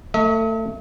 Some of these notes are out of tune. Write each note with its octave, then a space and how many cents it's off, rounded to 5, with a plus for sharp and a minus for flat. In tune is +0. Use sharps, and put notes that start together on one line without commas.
A3 +30 E5 -45